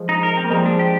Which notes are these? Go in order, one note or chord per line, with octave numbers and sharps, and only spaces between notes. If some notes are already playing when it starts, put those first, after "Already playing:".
Already playing: F3 G#3
D#4
A#4
C4
A#3
F3 G3 G#3
D4
G4